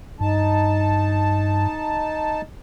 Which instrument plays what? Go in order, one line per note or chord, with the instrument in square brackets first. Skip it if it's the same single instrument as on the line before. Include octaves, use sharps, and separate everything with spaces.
[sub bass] G2 [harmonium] D#4 A5